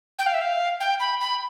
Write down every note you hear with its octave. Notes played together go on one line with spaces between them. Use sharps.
G5
F5
E5
F5
G5
B5
B5